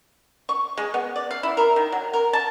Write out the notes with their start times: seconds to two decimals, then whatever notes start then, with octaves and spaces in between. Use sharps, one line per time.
0.49 C#6
0.77 G#3
0.94 B3
1.16 D5
1.31 F5
1.43 E4
1.57 A#4
1.76 D#3
1.92 F#3
2.13 A#4
2.33 A5